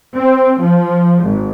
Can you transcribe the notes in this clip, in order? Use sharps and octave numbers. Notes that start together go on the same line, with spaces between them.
C4
F3
G#1